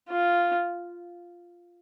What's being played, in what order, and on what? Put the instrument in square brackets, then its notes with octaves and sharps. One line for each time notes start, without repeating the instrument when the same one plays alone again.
[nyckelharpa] F4